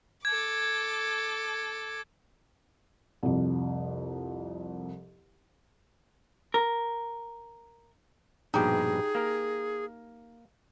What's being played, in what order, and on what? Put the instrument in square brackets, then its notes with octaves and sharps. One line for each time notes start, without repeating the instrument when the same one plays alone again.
[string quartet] A4 D6 [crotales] G#6
[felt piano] C2 F2
[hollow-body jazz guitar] A#4
[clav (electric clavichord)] A#1 G2 B2 [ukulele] D#4 G4 [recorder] G#4
[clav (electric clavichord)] A#3 A#4